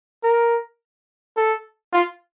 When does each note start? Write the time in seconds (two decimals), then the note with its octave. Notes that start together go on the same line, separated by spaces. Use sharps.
0.23 A#4
1.37 A4
1.93 F4